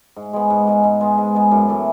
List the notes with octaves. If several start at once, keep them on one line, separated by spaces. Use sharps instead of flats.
G#2
G#3 B3
G#2
G#3 B3
G#2
G#3 B3
G#2
G#3 B3
F#2
E3 A3